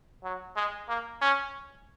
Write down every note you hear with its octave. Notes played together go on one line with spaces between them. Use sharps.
F#3
G#3
A#3
C#4